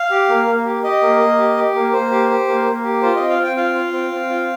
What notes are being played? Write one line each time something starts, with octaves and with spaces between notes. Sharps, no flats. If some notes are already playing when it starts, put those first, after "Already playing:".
Already playing: F5
G4
A#3
A#3
G4
G4 D#5
A#3
A#3
G4
G4
A#3
A#3 C5
G4
G4
A#3
A#3
G4
F4 C5
C4 D#5
F5
C4 G5
F4 F5
F4
C4
C4
F4